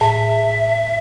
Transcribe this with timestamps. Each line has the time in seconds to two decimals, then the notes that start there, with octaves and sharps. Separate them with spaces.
0.01 A2 E5